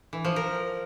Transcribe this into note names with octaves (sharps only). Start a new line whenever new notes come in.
E3
F3
A#4